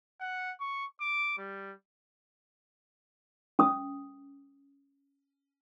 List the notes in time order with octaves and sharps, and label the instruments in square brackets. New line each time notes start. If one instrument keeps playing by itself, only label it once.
[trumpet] F#5
C#6
D6
G3
[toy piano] C#4 D#6